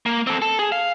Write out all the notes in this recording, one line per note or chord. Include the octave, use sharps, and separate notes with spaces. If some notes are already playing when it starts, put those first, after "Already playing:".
A#3
C4 A4
A4
G#4
F5